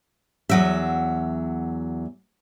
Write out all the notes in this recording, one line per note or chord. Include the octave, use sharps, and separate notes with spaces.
E2 F#3 E5